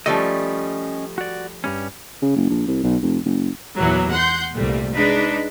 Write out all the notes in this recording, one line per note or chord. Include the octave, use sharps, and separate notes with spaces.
F3 G3 A3 C#4 D#5
F#4 D5
G2 G3 C#4
C#3
F#1
A#1
C2
B1
F1
F#1
E2 A#2 E3 F#3
F#5 C6 G6
C2 G2 A#2 G3 A3
G#3 D4 D#4 B4